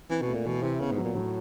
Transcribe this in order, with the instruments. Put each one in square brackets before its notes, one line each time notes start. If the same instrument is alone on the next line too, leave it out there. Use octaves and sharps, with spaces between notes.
[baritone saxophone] E3 [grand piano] C4
[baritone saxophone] B2
[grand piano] A3
[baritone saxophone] A#2
[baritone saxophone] B2 [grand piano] E3
[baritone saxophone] C3 [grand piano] E4
[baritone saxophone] C#3 [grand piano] B3
[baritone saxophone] G#2
[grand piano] F#3
[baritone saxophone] A#2
[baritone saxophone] A2 [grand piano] F#3